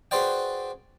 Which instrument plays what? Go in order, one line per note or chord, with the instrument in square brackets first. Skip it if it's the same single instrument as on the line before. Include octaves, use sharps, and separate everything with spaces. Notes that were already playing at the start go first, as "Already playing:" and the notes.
[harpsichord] F#4 G#4 B4 C5 D5 G5